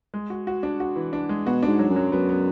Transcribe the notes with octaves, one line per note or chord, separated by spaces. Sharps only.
G#3
F#4
F#4
D4
F#4
E3
D4
G#3
B2 F#4
G#2 D4
F#3
F#2
F#3
F#2 B3
B3